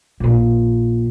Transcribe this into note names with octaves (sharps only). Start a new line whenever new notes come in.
A#1 A#2